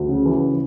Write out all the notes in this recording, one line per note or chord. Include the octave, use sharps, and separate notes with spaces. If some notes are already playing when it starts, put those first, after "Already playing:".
Already playing: D2
C#3
E3